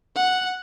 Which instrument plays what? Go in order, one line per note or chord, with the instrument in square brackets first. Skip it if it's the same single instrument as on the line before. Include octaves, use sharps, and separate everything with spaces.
[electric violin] F#5